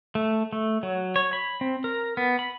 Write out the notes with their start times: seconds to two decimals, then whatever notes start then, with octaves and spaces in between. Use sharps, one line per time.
0.15 A3
0.53 A3
0.83 F#3
1.16 C#5
1.33 B5
1.61 C4
1.84 A#4
2.17 B3
2.39 B5